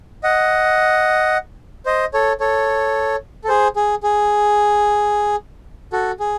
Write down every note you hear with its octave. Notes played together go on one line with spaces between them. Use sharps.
D#5 F#5
C5 D#5
A4 C#5
A4 C#5
A4
G#4 C5
G#4
G#4
F#4 A4
G#4